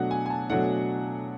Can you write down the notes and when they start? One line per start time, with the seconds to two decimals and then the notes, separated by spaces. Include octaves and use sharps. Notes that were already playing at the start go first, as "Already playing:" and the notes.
Already playing: B2 F#3 A3 D4 F#5
0.11 G#5
0.26 G#5
0.30 A5
0.50 B2 F#3 A3 D4 F#5